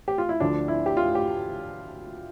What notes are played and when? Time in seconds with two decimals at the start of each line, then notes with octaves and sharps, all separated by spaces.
0.08 G4
0.18 F4
0.29 E4
0.40 D2 D3 F3 D4
0.68 E4
0.86 G4
0.97 F4
1.15 G4